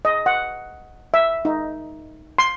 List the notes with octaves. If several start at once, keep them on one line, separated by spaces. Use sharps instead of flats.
D#5
F#5
E5
D#4
C6